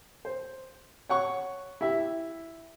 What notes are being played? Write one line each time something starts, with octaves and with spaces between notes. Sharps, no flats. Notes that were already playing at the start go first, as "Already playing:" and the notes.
C5
C#5 F#5 C#6
E4 G4 E5